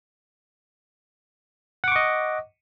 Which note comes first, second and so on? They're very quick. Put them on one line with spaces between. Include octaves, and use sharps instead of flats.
F#5 D6 C#6 D#5